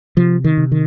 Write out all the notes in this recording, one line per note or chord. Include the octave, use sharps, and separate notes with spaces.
C3 F3
D#3
C3
D#3